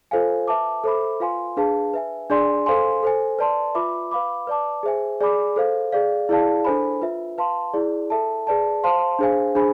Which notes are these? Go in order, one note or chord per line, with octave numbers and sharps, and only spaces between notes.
F4 A4 C5 F5 G#5
B4 E5 A5 D6
A4 C5 E5 B5 D6
F4 B4 F5 G#5 C6
D4 G#4 B4 F5 A5
B4 E5 G#5
D4 G#4 D5 G#5 C6
A4 C5 F5 G#5 C6
A4 C5 G#5
B4 D5 A5 C6
F4 B4 E5 B5 D6
B4 F5 B5 D6
B4 D5 A5 D6
G#4 C5 E5 G#5
G#4 D5 G#5 B5 D6
A4 C5 F5
G#4 D5 F5
E4 G#4 D5 F5 A5
D4 A4 C5 G#5 B5
F4 B4 E5
B4 F5 A5 C6
E4 G#4 D5
A4 E5 A5
G#4 B4 D5 A5
C5 F5 A5 C6
D4 G#4 C5 F5 G#5
D4 G#4 C5 G#5 B5